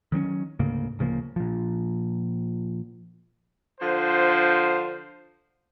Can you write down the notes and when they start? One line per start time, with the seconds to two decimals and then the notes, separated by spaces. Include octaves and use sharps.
0.12 D#3 F#3 C4 C#4
0.59 D2 G#2 C#3 A#3
0.99 D1 C#3 F3 A#3
1.36 A#2 F3
3.80 D3 F3 C5